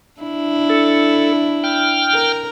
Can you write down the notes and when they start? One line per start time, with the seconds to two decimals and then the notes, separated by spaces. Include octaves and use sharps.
0.21 D4 E4
0.70 A4
1.64 G5 F6
2.13 A#4